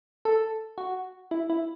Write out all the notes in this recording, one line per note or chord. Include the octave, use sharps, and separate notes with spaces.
A4
F#4
E4
E4